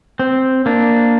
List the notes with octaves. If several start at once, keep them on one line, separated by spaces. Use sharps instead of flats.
C4
A#3 D4